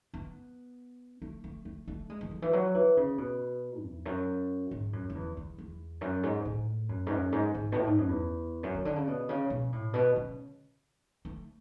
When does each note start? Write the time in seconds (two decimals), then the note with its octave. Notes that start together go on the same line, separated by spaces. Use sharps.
0.14 B3
1.22 A3
1.44 A3
1.65 A3
1.88 A3
2.10 G#3
2.21 E3
2.31 D3
2.42 E3
2.53 F#3
2.75 E3
2.97 C#3
3.18 B2
3.83 E2
4.05 F#2
4.71 G#2
4.93 F#2
5.10 F#2
5.15 E2
5.37 E2
5.58 E2
6.01 F#2
6.23 G#2
6.45 A2
6.89 F#2
7.07 G#2
7.11 F#2
7.32 G#2
7.54 G#2
7.72 B2
7.77 A2
7.86 G#2
7.98 F#2
8.09 E2
8.63 F#2
8.74 C#3
8.85 D3
8.96 C#3
9.07 B2
9.29 C#3
9.50 B2
9.72 A2
9.94 B2
10.16 C#3
11.25 A3